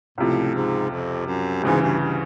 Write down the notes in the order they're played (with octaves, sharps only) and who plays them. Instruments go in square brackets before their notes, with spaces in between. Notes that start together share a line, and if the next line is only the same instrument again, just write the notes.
[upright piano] C#2 C3 F3 [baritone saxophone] A2
[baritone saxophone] G#2
F2
F#2
[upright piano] D2 C#3 E3 [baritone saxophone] G#2
[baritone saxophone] G2
G2